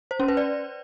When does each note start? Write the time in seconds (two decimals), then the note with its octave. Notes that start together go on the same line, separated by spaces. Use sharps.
0.11 C5
0.20 C#4
0.28 B4
0.37 D5